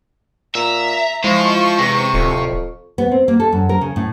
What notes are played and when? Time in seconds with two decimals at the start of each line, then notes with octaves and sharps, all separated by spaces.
0.55 A#2 E5 A#5
1.24 G#3 E4 F4 C5 C#6
1.79 E2 C3
2.14 D1 F2
2.98 B3
3.11 C4
3.28 A#3
3.40 A4
3.52 F#2
3.69 A#4
3.81 C#3
3.96 A2